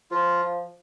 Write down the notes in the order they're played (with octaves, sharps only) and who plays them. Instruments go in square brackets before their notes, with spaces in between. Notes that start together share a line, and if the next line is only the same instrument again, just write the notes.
[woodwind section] F3 [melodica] F4